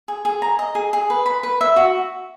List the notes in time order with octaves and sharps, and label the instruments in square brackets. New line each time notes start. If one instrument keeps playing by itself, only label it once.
[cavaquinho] G#4
G#4
A#5
D#5
G#4
G#4
B4
B5
B4
E5
F#4